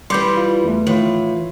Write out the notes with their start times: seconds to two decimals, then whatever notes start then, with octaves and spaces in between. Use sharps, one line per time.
0.10 E3 G3 C6 D6 G6
0.37 F4
0.64 E2 A3
0.87 A2 D#3 E3 F4